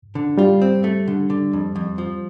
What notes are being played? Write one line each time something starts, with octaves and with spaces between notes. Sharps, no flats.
D3
G3 F4
C4
A3
D3
D3
F2
F2
F3